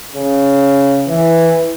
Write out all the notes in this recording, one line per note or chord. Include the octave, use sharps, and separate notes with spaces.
C#3
E3